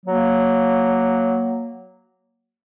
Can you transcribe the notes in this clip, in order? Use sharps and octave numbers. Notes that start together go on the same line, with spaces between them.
F#3 A#3